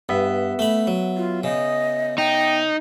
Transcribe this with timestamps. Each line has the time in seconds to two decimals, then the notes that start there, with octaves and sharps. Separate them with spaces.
0.09 G2 B3 E5
0.59 A3 B5
0.87 F#3
1.17 F4
1.44 C#3 D#5
2.18 D#4 G5